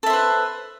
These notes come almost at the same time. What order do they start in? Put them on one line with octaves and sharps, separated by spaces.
A4 E5 C5 B4